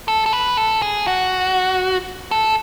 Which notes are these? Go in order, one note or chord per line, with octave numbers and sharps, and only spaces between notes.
A4
A4
B4
A4
G#4
F#4
A4